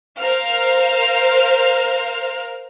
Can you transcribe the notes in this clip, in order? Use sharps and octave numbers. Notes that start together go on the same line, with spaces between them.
A#4 C5 F5 F6